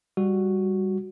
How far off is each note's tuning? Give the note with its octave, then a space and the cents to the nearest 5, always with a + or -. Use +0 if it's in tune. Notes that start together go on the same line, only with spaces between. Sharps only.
G3 +10 F#4 +0